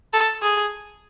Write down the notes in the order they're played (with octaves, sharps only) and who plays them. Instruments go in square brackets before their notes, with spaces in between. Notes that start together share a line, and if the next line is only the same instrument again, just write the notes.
[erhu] A4
G#4